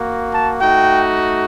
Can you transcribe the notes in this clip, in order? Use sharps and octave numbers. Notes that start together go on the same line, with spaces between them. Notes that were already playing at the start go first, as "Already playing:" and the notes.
Already playing: A#3 F#4
A5
A3 D#4 F#4 G5